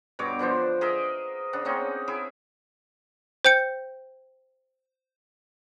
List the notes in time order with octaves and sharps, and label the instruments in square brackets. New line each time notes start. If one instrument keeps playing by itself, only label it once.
[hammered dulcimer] G2 B2 C#5 D6
D3 F3 D4 C5
G#4 A#4 D#5 E5
C#3 D4 F#5
A#3 C4 C#4 D#4
E4 G#4
[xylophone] C5 G5 G6 C#7